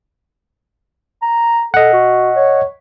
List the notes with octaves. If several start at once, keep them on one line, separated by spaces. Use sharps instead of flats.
A#5
A4 D#5 F#5
F#4
C#5